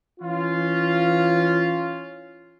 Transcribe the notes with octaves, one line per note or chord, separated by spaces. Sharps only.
E3 C#4 F4